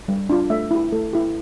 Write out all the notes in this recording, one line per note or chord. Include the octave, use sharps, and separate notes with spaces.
G3
D4 F4
A3 E5
E4 G4
A3 A4
E4 G4